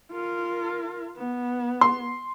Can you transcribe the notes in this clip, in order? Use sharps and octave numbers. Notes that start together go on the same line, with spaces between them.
F4 A#4
B3
C6